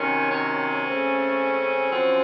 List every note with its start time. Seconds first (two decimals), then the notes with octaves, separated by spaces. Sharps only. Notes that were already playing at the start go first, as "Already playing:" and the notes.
Already playing: C3 D#3 F#3 C#4
0.31 C#4
0.85 C#3 A3 C4
1.90 F#2 F3 C4